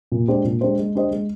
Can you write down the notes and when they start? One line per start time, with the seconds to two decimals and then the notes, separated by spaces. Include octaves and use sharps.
0.12 A#2
0.28 G#3 D4 G4 C5
0.45 A#2
0.61 G#3 D4 G4 C5
0.78 G#3
0.95 D4 G4 C5 D#5
1.11 G#3